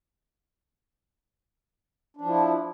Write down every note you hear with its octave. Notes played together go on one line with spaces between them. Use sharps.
F3 D4 E4